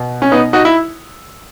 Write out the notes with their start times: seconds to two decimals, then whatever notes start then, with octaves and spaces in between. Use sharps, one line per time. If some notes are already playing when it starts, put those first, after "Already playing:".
Already playing: B2
0.22 C#4
0.32 B3 D#4
0.53 D#4 F#4
0.65 E4